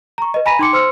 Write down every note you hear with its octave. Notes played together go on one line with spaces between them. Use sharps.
A#5 C#6
B4 D#5
G#5 A#5 B5 A#6 B6 D#7
D#4 G5 C6 D6 C#7
C5 C6 E6 F6 C#7